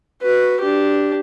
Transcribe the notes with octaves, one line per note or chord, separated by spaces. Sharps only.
F#4 B4
D4 G4